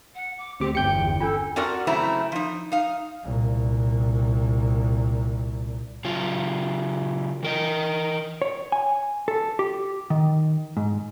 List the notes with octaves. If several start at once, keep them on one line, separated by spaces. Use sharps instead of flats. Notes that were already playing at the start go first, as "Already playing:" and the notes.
F#5
D6
D2 C4 G4 D6
G1 E2 G5 G6 C#7
C#4 D4 F4 A4
C4 D4 F#4 A#4 D5 F#5
F#2 C#3 A3 C4 E4 A#5
F3 D#4
D#4 F5
C2 A#2
C#3 F#3 F4
E3 A#4 D#5
C#5
G#5
A4
G4
D#3
G#2